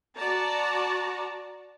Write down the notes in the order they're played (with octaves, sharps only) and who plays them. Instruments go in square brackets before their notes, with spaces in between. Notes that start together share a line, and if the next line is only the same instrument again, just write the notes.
[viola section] F#4 D5 A5 A#5